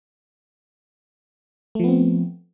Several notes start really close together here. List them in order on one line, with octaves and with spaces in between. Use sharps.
A3 F3 B3 C4